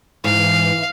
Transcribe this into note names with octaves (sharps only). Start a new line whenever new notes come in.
G#2 E3 F5